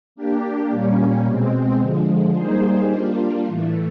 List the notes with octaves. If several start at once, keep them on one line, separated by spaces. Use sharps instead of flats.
A#3 D4 G4
A#2 G3 A#3 C#4
B2 G#3 C4
D3 F3 G#3
G3 A#3 D#4 G#4 C5
G3 A#3 D4 F4
A2 E3 A3